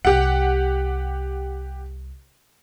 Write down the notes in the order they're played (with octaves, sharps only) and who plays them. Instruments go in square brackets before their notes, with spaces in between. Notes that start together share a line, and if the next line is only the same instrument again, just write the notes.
[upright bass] C2 [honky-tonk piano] G4 F#5